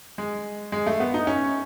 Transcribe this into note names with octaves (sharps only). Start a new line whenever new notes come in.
G#3
G#3
A3
B3
D#4
C#4